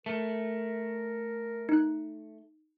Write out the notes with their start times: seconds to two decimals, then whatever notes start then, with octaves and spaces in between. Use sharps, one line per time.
0.06 A3 A#4
1.69 D#4 F#6